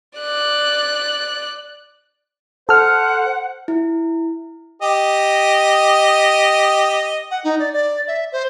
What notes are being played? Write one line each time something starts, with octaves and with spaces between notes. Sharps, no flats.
D5 F#6
A4 C5 F#5 F6
E4
G4 D#5
F#5
D#4
D5
D5
E5
C5